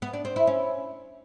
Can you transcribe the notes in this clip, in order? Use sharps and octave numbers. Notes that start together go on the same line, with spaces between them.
B3
D4
C4
E4
C#4